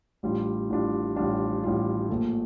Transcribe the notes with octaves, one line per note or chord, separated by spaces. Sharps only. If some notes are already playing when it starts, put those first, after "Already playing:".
A1 A2 G3 D4 F4
A1 A2 G3 D4 F4
A1 A2 G3 D4 F4
A1 A2 G3 D4 F4
A#1 A#2 A3